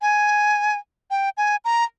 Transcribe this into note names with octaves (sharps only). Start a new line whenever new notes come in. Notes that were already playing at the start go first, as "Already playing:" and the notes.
G#5
G5
G#5
A#5